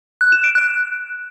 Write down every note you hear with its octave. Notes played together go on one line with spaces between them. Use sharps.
F#6
E7
D7
F#6